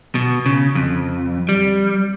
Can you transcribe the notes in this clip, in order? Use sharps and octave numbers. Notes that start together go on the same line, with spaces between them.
B2
C#3
F2
G3